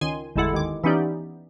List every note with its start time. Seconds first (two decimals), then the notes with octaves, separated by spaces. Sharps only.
0.01 C#2 D#3 G#5 C6 D#7
0.36 G1 E2 G#3 E4 A4 F#5
0.53 D#2 D#3 G#3 D6
0.84 E3 B3 C#4 D#4 G4 D5